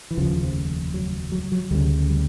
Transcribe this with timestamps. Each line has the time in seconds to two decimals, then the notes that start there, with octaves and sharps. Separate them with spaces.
0.11 E3
0.17 F1 D#2 C#3 F3
0.94 F#3
1.32 F#3
1.52 F#3
1.71 D2 C#3 G3
2.09 G3